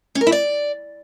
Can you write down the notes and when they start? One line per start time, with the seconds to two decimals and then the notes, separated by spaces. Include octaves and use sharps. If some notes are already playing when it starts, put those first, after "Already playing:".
0.15 C#4
0.21 A#4
0.27 E4
0.32 D5